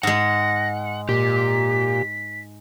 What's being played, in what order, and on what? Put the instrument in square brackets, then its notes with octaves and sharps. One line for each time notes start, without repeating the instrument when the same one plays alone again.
[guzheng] G#2 G#3 [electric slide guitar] F#5 [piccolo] A#6
[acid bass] A#2 [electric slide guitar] G4 [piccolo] B6